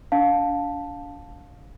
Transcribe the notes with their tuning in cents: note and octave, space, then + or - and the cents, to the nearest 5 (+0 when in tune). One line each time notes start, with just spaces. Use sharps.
D4 -35 F5 +25 A5 +0